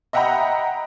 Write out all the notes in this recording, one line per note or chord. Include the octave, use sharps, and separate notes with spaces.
D#5 E5 F#5 G5 A#5 B5